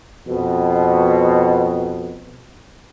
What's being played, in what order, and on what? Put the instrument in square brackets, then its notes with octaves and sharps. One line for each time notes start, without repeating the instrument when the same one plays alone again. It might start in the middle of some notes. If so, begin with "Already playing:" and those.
[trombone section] F2 B2